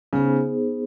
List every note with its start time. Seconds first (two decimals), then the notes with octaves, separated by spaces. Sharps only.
0.13 C#3 B3 D#4 G#4 C5